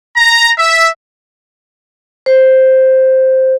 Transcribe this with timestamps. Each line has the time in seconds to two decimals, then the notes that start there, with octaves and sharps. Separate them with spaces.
0.17 A#5
0.59 E5
2.26 C5